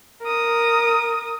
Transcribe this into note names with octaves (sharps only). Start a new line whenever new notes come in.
A#4 D#6